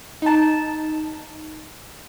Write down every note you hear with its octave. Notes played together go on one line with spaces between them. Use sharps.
D#4 A5